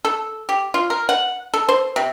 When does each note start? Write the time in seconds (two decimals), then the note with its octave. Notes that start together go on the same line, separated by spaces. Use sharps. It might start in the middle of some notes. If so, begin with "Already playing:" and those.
0.05 A4
0.49 G4
0.74 F4
0.90 A#4
1.09 F#5
1.54 A4
1.69 C5
1.96 C3